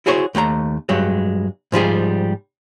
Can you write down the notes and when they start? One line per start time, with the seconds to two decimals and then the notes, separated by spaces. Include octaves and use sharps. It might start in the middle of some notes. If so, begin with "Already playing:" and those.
0.06 E4 F#4 G#4 C5 C#5
0.35 D#2 A3 F#5 A#5
0.89 G2 F#3 G#3
1.72 G#2 F3 G3 G#4